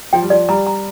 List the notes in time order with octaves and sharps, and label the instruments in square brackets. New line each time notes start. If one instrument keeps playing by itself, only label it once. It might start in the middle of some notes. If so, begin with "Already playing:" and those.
[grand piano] F3 [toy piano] G5
[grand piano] G3
[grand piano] F3 [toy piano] D5
[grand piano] G3 [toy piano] A#5
[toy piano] A#5